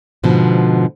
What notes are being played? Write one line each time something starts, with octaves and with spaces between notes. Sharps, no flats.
G#2 B2 D3 F3